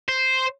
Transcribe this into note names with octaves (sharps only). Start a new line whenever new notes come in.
C5